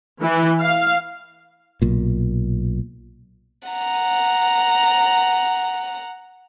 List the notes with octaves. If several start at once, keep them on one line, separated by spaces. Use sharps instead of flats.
E3
F5
B1 A#2
F#5 A#5